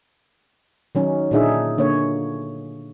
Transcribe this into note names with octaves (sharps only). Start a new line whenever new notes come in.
D#3 F#3 C#4 D#4
A#2 D3 D4 D#4 G#4 E5
D3 A#3 C#5